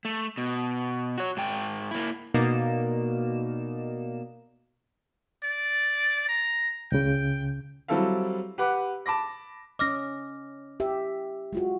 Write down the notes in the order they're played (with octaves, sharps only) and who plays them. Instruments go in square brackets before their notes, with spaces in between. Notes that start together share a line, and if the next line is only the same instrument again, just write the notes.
[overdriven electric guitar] A3
B2
F#4 C#5
G#2 G5
A#3 E4
[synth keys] B2 A#3 D#4 D5 E7
[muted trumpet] D5
A#5
[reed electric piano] C#2 C#3 [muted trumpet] G5
[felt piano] F#3 G3 C4 E4 A4 F5
G4 B4 F#5 D6
A5 B5 D6 A#6
[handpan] C#4 D#5 [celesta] D6 F6 A#6
[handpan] G4 E5
G#3 F4 F#4